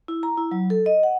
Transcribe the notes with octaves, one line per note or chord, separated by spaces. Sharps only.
E4
A#5
E4
F#3
A4
D#5
F#5